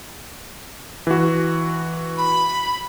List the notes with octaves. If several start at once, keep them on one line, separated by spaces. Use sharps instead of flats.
E3 F#4
B5